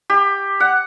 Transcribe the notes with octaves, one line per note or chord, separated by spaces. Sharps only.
G4
F#5